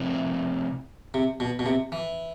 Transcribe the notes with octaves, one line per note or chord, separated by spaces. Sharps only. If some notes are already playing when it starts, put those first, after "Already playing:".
Already playing: C3 F3 C4 E4
C3
B2
B2
C3
E3